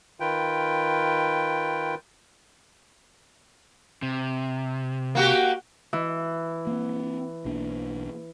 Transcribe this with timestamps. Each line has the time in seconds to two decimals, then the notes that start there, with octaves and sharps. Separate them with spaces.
0.20 D#3 F4 B4 G5
4.02 C3
5.15 A#3 F#4 G4
5.93 E3
6.67 A#3 C4
7.45 B1 A#3 D4